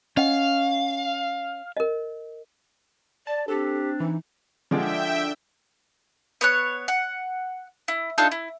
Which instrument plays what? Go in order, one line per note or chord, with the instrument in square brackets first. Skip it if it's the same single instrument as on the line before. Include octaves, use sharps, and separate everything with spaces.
[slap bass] C#4 [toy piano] D#5 F#5 [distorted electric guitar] F5
[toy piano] A#4 D#5
[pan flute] D5 [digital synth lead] A5
[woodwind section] C4 D4 [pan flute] G4 [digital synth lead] A4
[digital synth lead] E3 [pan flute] D#4
[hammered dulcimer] D3 D4 D6 [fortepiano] F3 G#3 [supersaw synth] E5 G5
[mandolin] B3 C#5 F#6
F#5
E4
D4 D#4 F4 A4
E4